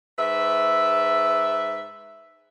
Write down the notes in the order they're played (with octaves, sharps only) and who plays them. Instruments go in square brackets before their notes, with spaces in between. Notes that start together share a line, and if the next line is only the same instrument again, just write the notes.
[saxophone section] G#2 B4 E5